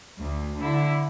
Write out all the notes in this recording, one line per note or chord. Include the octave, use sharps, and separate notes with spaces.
D2
D3 E4